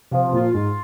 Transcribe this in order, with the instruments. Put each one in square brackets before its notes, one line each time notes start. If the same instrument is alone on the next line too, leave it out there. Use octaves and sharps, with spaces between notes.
[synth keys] C3 [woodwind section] F3
[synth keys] C3
[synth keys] A#2 [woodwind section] F4
[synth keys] G#2 [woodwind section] F4